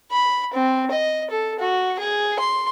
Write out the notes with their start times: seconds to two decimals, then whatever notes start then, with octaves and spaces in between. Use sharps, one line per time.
0.12 B5
0.54 C4
0.91 D#5
1.30 A4
1.60 F#4
1.99 G#4
2.40 C6